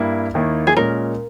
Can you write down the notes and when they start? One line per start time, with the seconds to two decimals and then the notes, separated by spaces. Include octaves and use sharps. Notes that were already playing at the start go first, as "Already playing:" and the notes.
Already playing: G2 G3 A#3 E4
0.34 D#2 D#3 A#3 E4
0.67 G#4
0.76 A#2 G#3 C#4 A#4